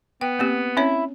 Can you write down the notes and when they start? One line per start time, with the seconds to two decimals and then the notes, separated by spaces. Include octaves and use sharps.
0.21 B3 G5
0.39 A#3 C4 G4
0.77 C4 C#4 E4 C#5